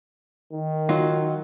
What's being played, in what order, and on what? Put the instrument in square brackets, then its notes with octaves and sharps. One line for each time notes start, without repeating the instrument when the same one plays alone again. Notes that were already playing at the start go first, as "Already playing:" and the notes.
[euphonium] D#3
[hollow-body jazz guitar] F#3 D#4 F4